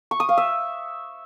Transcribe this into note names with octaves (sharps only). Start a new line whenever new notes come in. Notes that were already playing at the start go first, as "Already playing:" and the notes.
C#6
D#6
F5
E5